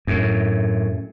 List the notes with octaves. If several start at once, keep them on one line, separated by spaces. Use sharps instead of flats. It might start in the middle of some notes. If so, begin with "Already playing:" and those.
F#2 A2